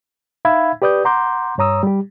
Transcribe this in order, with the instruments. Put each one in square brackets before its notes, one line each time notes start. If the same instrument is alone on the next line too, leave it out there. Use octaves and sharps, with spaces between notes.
[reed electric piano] D#4 E5 F5 B5 E6 G#6
G4 B4 D5 D#6 G6
F#5 A#5 C6 D6 G6
G2 C#5 A#5 D#6 E6
G3 G4